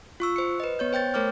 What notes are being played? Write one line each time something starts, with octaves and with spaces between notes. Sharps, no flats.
F4 C#6 E6
C5 C#7
B4 D#5
B3 C#5 G6
C5 G5 G6 A6
A3 A#4 C5 C#5 D6 F6